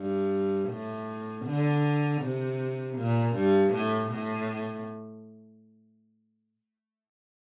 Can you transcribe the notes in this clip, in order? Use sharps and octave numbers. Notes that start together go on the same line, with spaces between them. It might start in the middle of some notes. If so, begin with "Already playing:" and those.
Already playing: G2
A2
D3
C3
A#2
G2
A2
A2